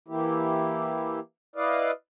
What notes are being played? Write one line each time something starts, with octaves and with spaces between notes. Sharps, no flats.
E3 A#3 E4 G4
E4 B4 D5 D#5 F5